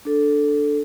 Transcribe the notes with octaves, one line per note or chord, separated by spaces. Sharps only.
D4 A4